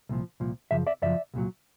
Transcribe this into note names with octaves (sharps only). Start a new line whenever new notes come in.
C2 A#2 F3
C2 A#2 F3
F#2 C#3 F3 E5
D5 E5
F#2 C#3 F3 D5 E5
C2 A#2 F#3